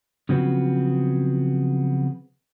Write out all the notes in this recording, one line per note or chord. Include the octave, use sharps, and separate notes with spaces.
C#3 F3 F#3 B3 C4